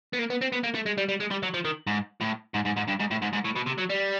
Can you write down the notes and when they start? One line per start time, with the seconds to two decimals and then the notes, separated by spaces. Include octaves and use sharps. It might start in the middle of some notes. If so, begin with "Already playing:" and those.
0.13 B3
0.19 A#3
0.30 B3
0.41 C4
0.52 B3
0.64 A#3
0.75 A3
0.86 G#3
0.98 G3
1.09 G3
1.20 G#3
1.31 G3
1.43 F#3
1.54 F3
1.65 D#3
1.87 G#2
2.21 A2
2.55 G#2
2.66 G#2
2.77 G#2
2.88 G2
3.00 G#2
3.11 A2
3.22 G#2
3.33 G#2
3.45 A2
3.56 B2
3.67 C3
3.78 F#3
3.90 G3